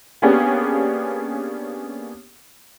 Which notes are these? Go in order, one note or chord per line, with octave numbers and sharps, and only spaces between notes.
A#3 B3 C#4 D4 G4 G#4